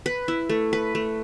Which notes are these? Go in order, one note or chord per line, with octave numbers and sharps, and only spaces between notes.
B4
E4
A3
B4
A3